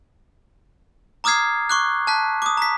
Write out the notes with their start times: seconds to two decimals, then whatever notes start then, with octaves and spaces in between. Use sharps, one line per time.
1.24 A#5 D6 D#6 F6 G#6 C7
1.69 C#6 D6 F#6
2.07 A5 F#6 B6
2.42 D6 D#6
2.57 A#5 B6